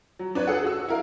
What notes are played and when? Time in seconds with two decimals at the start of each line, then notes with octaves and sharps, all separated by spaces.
0.19 F#3
0.35 D4 B4 C#5
0.47 G#4 A4 B4 F#5
0.65 F#4 E6
0.88 E4 A#4 F5